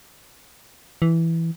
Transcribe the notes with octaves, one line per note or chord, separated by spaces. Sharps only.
E3